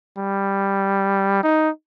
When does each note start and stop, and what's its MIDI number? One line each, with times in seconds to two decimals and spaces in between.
0.17 1.38 55
1.43 1.69 63